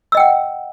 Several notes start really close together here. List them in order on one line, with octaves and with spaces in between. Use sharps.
E6 D#5 G5 F#5